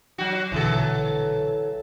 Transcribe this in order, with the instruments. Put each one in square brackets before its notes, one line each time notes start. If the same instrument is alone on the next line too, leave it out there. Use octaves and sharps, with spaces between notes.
[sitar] F#3 F#4
[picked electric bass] A#1 B2 D3 [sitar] E3 F#3 A4